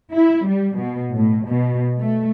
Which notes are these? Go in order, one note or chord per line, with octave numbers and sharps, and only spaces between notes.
E4
G3
B2
A2
B2
A3